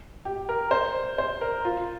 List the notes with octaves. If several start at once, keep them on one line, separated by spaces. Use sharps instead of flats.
G4
A#4
C5
C5
A#4
F4